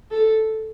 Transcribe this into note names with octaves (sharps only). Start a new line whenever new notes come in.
A4